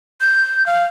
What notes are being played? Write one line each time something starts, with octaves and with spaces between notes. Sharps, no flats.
G6
F5